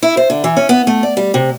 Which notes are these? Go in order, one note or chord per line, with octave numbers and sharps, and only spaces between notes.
E4
C5
D3
E3
C#4
B3
A3
D5
G3
C3